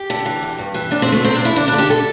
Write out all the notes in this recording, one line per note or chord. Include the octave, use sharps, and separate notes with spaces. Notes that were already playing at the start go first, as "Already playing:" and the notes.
Already playing: G4
D3
E3
E2
G2
E3
D2 D4
C4
D2 A3
E2 C4
E2 D4
E4
D3 D4
D4
D3
G4
A4